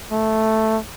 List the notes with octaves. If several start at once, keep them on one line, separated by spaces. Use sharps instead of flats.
A3